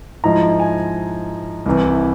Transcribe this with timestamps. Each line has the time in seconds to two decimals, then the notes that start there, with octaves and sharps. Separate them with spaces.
0.24 G#2 F3 G#3 E4 A#5
0.60 G#5
1.66 C2 C3 E3